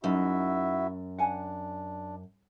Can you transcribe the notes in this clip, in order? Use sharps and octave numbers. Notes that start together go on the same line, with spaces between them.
F#2 D#4 E4 F#4 E5
D4 F#5 G#5